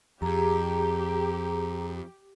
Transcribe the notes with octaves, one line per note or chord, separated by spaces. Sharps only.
F2 G4 G#4 A#5